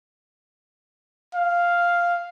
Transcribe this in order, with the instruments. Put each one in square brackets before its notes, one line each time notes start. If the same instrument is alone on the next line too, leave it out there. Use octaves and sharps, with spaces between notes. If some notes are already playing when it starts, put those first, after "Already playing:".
[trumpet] F5